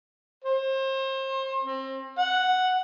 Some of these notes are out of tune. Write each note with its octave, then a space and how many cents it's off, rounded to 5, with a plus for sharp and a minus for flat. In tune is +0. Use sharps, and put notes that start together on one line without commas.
C5 +35
C4 +30
F#5 +0